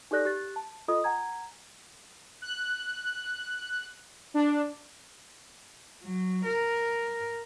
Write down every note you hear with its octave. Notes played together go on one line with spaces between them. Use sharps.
D#4 G4 A4 D5 F#6 A#6
G4 F#6 A6
A5
F4 A4 D#5 D#6
F#5 G#5 A#5 G#6
F#6
D4
F#3
A#4